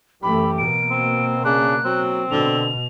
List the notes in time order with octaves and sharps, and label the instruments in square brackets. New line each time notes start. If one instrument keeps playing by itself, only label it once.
[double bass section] F#2 E3 A3 [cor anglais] G4 [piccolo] B5
[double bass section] B2 A#3 [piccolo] D7
[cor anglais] C4
[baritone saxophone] C#3 [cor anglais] D4 [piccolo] F#6
[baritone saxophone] F#3 [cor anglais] C4
[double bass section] B2 [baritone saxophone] D3 [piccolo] F7